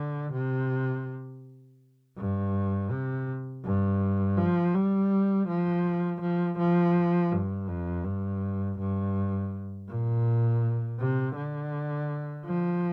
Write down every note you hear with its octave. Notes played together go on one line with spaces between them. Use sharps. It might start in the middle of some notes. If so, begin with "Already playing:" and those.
Already playing: D3
C3
G2
C3
G2
F3
G3
F3
F3
F3
G2
F2
G2
G2
A#2
C3
D3
F3